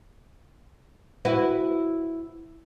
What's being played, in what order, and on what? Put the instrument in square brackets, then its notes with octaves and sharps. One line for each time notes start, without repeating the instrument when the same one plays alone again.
[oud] E4 F#4 B4